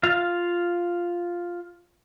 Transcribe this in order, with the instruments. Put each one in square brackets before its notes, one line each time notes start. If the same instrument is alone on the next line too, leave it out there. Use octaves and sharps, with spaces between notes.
[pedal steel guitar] F4 F5